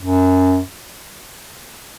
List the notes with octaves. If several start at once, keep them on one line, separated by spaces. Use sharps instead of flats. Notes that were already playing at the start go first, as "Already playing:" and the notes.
F#2